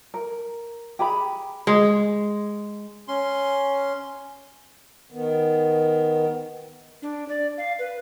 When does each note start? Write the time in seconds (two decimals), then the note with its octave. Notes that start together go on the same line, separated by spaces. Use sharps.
0.14 A#4
0.99 G4 G#4 A#5 B5
1.67 G#3
3.08 C#4 C6
5.12 D#3 B3
7.02 D4
7.29 D5
7.58 F5
7.79 B4